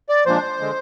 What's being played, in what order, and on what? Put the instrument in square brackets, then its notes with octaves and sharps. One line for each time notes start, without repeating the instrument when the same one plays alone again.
[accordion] D5
A#2 F3 G#3 D4 C5
D3 G#3